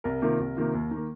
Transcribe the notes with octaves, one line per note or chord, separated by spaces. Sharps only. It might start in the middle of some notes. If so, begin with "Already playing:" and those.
C2 A#4
C3 D#3 A#3 F4
C2
C3 D#3 A#3 F4
D#2
D#3
A#3